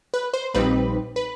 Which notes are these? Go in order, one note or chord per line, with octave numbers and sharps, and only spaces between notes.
B4
C5
A#1 A#2 G3 C4 D#4 B4
B4